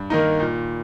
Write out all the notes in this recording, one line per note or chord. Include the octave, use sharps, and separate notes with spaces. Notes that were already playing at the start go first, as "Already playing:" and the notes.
Already playing: G2
D#3 A#3 D#4
A#2